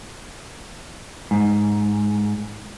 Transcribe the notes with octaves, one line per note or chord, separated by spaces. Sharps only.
G#2